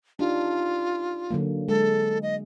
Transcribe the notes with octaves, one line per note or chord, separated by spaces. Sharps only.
D4 D#4 F4 G4
D3 F#3 A#3
G#3 A4
D#5